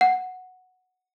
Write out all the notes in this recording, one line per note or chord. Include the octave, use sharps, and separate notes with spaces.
F#5